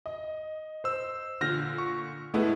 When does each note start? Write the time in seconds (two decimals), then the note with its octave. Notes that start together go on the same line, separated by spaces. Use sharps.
0.06 D#5
0.84 C5 E6
1.41 A#2 D3 F6 G6 A#6
1.78 C#6
2.34 A2 G#3 A3 B3 E4